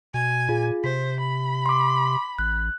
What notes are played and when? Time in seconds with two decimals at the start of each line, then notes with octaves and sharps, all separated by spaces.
0.14 B2 G#5
0.49 A#2 F4 G#4
0.84 C3 C5 B6
1.20 B5
1.66 C6 D6
2.39 A1 F#6